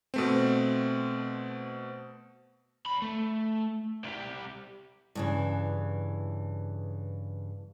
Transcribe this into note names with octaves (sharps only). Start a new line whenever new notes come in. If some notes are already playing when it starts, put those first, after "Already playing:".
B2 A3 C4
E2 B5
A3
C2 G4
G2 C#3 E3